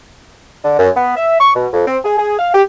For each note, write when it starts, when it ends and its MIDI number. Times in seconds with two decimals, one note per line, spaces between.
0.64 0.75 50
0.79 0.90 42
0.96 1.14 59
1.17 1.38 76
1.40 1.53 85
1.55 1.66 47
1.73 1.84 41
1.86 1.98 60
2.04 2.16 68
2.17 2.39 68
2.39 2.54 77
2.54 2.62 67